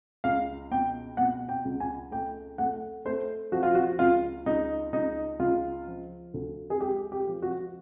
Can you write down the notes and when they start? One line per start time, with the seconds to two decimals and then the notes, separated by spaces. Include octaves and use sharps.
0.24 C#2 F5
0.71 B2 G5
1.17 B2 F#5
1.49 G5
1.65 C#2
1.80 G#5
2.11 A3 G5
2.58 A3 F#5
3.05 A3 C5
3.52 F3 F#4
3.63 F4
3.75 F#4
3.99 C#2 F4
4.46 C#2 D#4
4.93 C#2 D#4
5.40 C#2 F4
5.87 F3
6.34 D2
6.70 G#4
6.80 G#3 G4
7.12 G4
7.27 F3
7.42 F#4